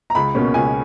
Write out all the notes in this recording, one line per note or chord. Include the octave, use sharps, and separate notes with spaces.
A#5
C#2 B5
B2 A#3 C#4
C#2 G#5